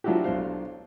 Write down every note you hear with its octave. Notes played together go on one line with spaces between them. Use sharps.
F3 F#3 D4 E4 F#4 G4
B1 D4 C5 F5